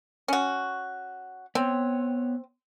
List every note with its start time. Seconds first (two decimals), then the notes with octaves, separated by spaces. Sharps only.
0.28 C#4 F#4
1.55 B3 C4 C#5